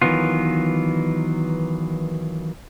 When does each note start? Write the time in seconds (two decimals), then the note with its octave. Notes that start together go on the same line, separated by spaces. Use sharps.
0.02 D#3 E3 F#3 B3 F4